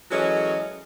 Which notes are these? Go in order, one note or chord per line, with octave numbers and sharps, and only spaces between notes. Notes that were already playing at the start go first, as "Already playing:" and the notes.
E3 F#3 G#3 C#4 A4 D#5